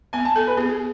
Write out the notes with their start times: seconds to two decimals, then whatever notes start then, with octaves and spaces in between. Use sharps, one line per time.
0.13 B3 G#5
0.25 A5
0.36 A4 G#5
0.47 B4
0.57 B3 G#4
0.69 G#4